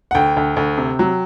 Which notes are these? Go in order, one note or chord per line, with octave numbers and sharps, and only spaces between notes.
F#5
D2 G5
D2
D2
C3
F#3